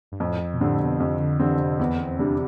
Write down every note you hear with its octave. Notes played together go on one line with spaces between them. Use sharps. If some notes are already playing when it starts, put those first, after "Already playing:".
G2
F2 A2
B2
A2 D3 G3 C4
B2
F2 C3
D3
D3 E3 G3 C4
C3
E2 B3
C4
C3 G3 D4